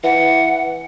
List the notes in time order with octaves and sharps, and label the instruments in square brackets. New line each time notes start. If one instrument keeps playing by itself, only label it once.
[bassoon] E3 [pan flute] F#5